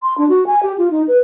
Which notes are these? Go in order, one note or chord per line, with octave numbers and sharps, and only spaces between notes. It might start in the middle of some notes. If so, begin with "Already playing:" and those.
C6
D4
F#4
G#5
G4
F4
D#4
B4